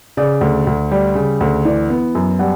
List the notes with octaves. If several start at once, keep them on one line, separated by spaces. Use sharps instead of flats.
C#3 D5
D2
D2
G3
C#3
D2
E3 D5
B3
F#2
G3 F#5